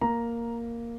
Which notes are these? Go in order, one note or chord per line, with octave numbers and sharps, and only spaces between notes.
A#3 A#5